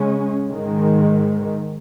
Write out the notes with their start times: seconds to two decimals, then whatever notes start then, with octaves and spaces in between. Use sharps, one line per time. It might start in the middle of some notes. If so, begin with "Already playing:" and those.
Already playing: C#3 G#3 C#4
0.49 G#2 D#3 G#3